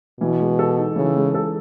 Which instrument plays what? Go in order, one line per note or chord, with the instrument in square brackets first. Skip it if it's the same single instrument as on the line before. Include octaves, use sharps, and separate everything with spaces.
[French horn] B2 [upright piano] E3
[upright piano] G#3
A4
D#4
[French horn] C#3 [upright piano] E3
[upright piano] G#3
A4